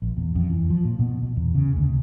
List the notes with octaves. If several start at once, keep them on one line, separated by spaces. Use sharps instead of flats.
A#1
E2
F2
E3
F3
A#2
B2
B2
E2
C#3
D2
C3